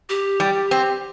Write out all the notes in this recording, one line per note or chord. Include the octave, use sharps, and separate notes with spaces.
G4
G3
C4